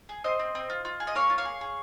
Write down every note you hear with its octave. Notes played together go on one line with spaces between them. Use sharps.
G#4
C4 C5 D#5
C4
C4
F4
F4
G#4
D#5
A#3 C#5 F5
F4
C#5 F5
G#4
G#4